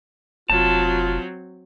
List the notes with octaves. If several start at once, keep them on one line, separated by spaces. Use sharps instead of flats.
F1 F#3 C4 F4 A5